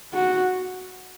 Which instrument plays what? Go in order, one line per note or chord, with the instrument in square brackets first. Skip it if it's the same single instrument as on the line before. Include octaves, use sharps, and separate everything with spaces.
[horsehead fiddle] F#4